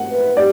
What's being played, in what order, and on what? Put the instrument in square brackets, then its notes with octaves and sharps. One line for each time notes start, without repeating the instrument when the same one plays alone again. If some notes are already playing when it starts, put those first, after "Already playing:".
Already playing: [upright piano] F#5
[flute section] B4 E5
[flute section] G4 [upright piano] D5